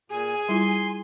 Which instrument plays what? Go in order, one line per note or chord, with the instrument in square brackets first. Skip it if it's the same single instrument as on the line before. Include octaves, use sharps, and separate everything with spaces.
[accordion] A#2 [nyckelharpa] G#4 [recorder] G#5
[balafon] G3 E4 F4 [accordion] C6